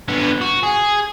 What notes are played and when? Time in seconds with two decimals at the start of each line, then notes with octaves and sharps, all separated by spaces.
0.08 D3 B3
0.41 F#4
0.63 G#4